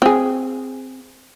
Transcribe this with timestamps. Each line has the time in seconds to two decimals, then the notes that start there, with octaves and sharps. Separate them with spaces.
0.02 C4 G#4